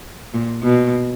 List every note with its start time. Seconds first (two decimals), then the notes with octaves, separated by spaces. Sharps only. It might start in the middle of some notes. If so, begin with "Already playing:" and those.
0.34 A#2
0.63 B2